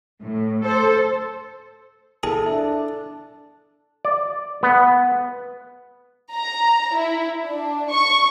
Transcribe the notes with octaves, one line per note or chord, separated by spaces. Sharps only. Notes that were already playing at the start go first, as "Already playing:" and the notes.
A2
A4 C5
E4 G#4 A4 A5
D4 E5
D5
B3
A#5
E4
D4
C#6